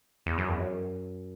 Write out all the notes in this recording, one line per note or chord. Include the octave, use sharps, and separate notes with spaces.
E2
F#2
E2
F#2